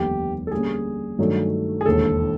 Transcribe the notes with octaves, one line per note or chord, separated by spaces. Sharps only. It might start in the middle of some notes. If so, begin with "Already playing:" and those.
Already playing: F1 D#2 D3 G3 B3 G4
A4
D3 G3 A#3 C#4 G#4
G2 D#3 F#3 A3 D4
G#4
E1 D#2 D3 A4